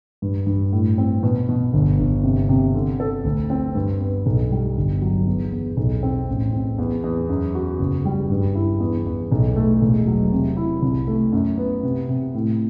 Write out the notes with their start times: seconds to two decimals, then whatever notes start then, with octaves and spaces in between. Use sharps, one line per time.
0.22 G2
0.47 G2
0.72 A2
0.98 C4
1.23 B2
1.49 B2
1.73 G1
1.99 G1
2.23 C3
2.49 C3
2.74 D3
3.00 A4
3.24 D2
3.50 C4
3.75 G2
4.01 B3
4.26 B1
4.52 G3
4.77 G1
5.02 F#3
5.27 E2
5.52 E2
5.77 B1
6.03 C4
6.29 A1
6.53 C4
6.78 E2
7.04 E2
7.29 F#2
7.55 F#4
7.79 F#1
8.05 G3
8.30 G2
8.55 E4
8.80 E2
9.06 E2
9.32 B1
9.56 A3
9.82 E1
10.07 F#3
10.32 C3
10.57 E4
10.82 C2
11.08 A3
11.32 F#2
11.58 B3
11.83 C3
12.09 C3
12.34 A2